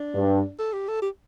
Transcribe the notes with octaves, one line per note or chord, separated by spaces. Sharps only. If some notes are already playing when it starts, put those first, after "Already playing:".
Already playing: D4
G2
A4
G4
A4
G4